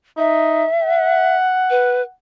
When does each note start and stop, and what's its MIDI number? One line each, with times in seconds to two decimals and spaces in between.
0.18 0.65 63
0.18 1.36 76
0.84 2.13 78
1.70 2.02 71